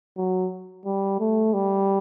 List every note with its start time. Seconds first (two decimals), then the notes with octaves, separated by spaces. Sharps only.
0.17 F#3
0.86 G3
1.20 A3
1.54 G3